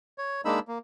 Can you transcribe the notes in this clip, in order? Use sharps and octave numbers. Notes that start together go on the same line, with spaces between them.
C#5
G#3 A#3 D4 D#4 B5 E6
A#3